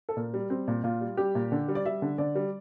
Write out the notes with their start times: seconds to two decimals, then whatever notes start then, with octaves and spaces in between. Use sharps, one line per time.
0.09 A4
0.17 A#2 A#4
0.34 G3
0.50 G3 C4
0.68 A#2
0.84 A#2 F4
1.01 G3
1.17 G3 G4
1.35 A#2
1.52 D3
1.68 G3
1.75 D5
1.86 G3 E5
2.02 D3
2.18 D3 D5
2.35 G3